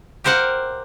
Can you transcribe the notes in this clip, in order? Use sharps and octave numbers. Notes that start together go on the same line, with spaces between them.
G4 A#4 C5 F5 F#5